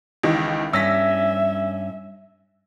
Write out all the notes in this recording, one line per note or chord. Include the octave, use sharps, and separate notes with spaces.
C#2 D#3 E3
G2 C#4 E5 E6 A#6 B6